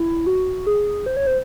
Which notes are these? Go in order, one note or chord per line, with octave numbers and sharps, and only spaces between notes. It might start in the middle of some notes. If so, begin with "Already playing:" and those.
Already playing: E4
F#4
G#4
C5
C#5
C5